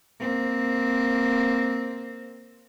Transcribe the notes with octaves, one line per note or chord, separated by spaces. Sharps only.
A#3 C4